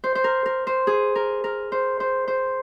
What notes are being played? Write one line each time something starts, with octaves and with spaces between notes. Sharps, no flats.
C5
C5
A#4
A#4
C5
G#4
A#4
A#4
C5
C5
C5